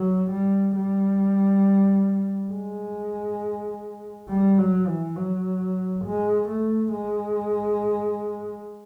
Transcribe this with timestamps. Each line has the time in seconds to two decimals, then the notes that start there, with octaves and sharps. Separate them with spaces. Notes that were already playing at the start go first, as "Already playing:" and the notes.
Already playing: F#3
0.31 G3
0.76 G3
2.52 G#3
4.29 G3
4.58 F#3
4.87 E3
5.16 F#3
6.05 G#3
6.49 A3
6.93 G#3